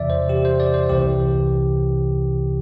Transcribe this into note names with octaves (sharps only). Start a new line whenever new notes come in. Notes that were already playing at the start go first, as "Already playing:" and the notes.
Already playing: E2 C3 E3 D5 E5
C5
G4
C5
D5
C5
C2 C3 E3 G4